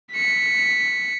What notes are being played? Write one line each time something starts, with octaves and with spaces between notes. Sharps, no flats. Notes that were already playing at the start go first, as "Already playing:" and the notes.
B6 C#7